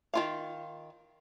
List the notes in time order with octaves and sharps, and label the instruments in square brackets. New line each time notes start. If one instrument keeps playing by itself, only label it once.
[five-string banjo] D#3 F4 F5